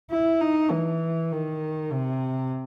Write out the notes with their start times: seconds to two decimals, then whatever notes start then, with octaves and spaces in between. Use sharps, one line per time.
0.10 E4
0.41 D#4
0.71 E3
1.32 D#3
1.92 C3